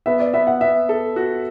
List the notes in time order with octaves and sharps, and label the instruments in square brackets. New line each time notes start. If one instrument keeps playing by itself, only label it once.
[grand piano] B3 [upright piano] E5
[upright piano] D5
[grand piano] B3 [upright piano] E5
[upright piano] F#5
[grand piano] B3 [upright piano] E5
[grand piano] A4
F#4